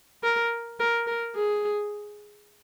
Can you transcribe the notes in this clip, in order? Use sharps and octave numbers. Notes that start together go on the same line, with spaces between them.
A#4
A#4
A#4
G#4